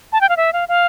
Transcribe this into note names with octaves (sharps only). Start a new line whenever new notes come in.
A5
G5
F5
E5
F5
F5